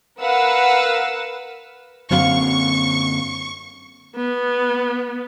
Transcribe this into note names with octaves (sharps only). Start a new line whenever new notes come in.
A#4 B4 F5 F#5 E6
F#2 D3 A#3 C4 F#4 F5 C#6
B3